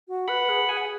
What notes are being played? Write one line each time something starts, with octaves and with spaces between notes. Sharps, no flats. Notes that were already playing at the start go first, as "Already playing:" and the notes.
F#4
B4 F#5 B5
G#4
G#4 G#5
F#5